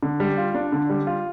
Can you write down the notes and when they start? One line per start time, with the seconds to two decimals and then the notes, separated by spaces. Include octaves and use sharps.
0.03 D3
0.20 G3
0.37 F4
0.55 D4
0.72 D3
0.90 G3
1.07 F4